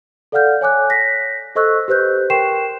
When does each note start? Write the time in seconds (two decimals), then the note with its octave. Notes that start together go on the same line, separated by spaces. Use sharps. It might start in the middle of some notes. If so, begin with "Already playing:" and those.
0.32 A4 D5 F5 F#5 F6 G6
0.61 C#5 G#5 D6 F#6
0.90 A#6 B6
1.55 A4 C5 D#5 C#6 E6 F#6
1.88 G4 B4 C5 F#6 G6
2.30 A#4 G5 C6 C#6 C7 E7